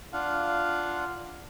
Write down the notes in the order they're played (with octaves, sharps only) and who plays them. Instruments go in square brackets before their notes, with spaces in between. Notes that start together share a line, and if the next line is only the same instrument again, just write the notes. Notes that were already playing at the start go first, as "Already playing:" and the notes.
[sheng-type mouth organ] D4 F4 F5 F#5